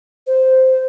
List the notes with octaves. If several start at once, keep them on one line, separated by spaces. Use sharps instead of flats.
C5